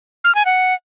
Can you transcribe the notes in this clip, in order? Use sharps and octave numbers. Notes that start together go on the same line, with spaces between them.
F6
G#5
F#5